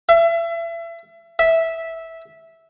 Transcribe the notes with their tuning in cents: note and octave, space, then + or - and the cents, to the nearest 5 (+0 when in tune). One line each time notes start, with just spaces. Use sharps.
E5 +30
E5 -10